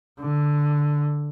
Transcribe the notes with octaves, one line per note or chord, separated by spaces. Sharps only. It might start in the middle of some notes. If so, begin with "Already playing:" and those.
D3